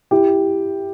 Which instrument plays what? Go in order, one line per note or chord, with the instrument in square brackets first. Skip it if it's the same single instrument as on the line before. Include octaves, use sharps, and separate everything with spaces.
[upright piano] E4 G4